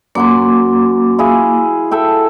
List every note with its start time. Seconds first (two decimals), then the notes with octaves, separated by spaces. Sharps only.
0.15 F#2 A#3 F#5 C6 D6
1.19 E4 G#4 F5
1.91 A4 E5 G5